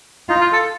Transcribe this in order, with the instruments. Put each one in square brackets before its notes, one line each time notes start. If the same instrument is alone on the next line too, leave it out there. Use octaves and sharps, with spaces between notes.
[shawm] D#4 [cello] F4
[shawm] F4
A4